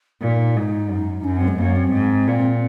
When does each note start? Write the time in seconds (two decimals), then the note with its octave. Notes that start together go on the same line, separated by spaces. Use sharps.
0.22 A#2 D#4
0.56 G#2
0.90 F#2
1.24 F#2 C#4
1.37 C4
1.48 G#3
1.58 F#2 A#3
1.76 C4
1.93 G#2
2.28 A#2